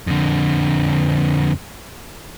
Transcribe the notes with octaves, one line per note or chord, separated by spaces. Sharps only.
F2 D3